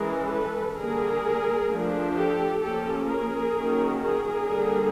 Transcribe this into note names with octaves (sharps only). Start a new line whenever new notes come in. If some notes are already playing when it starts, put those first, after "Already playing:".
Already playing: E3 G#3 C#4 G#4 A#4
A4 B4
D3 G3 A#3 G#4 A#4
F3 A3 D4
G4 A4
F3 A#3 C#4 G4 A4
G#4 A#4
D#3 F#3 A#3 C#4
G#4 A#4
D3 G3 A#3